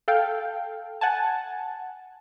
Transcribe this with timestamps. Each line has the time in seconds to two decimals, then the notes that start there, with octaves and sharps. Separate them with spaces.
0.08 A4 F5 G5
1.01 F#5 G#5 A5